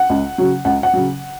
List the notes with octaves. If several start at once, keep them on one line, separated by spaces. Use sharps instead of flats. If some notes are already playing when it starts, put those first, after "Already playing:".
Already playing: F#5
C#2
C#3 F#3
C#2 F#5
F#5
C#3 F#3